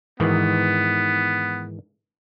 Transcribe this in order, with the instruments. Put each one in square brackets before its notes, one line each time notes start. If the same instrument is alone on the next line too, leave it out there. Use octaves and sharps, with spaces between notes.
[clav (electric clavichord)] G#2 D#3 E3 [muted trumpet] B3